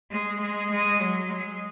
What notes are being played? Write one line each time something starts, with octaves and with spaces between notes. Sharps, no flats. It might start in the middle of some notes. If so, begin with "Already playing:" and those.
G#3
G#3
G#3
F#3
G#3